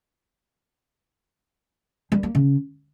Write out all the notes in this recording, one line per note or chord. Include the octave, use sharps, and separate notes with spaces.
G3
A#3
C#3